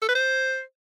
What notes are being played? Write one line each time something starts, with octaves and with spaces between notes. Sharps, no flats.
A4
B4
C5